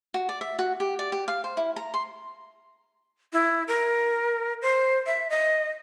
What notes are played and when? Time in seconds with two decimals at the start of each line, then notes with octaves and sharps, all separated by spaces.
0.14 F#4
0.29 D5
0.41 E5
0.59 F#4
0.80 G4
0.99 D5
1.12 G4
1.28 F5
1.44 C5
1.57 E4
1.76 A#5
1.94 C6
3.33 E4
3.68 A#4
4.62 C5
5.06 E5
5.30 D#5